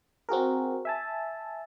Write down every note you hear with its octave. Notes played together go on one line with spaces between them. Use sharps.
C4 F#4 G#4 A#4
E5 G#5 A5